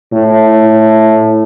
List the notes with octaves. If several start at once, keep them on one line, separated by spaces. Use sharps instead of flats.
A2